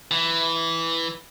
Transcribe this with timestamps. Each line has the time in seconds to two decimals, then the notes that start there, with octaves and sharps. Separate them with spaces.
0.11 E3